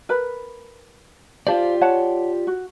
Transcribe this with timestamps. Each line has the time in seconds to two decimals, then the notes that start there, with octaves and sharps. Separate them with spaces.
0.09 A#4 B4 B5
1.47 F4 G4 C5 D5 F5 A5
1.81 C#5 F#5 A5
2.47 F#4